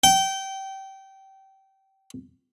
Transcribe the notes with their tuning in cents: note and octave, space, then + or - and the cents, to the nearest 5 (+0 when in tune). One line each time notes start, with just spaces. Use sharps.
G5 -25